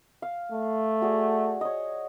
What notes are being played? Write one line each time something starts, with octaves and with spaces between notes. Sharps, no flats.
F5
A3
F#4 G#4 D5
C#5 D#5